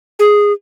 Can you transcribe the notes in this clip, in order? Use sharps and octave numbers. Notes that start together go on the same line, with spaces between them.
G#4